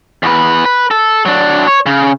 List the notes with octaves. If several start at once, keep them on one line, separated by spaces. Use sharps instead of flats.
E2 B4
B4
A4
F#3 D4
C#5
C#3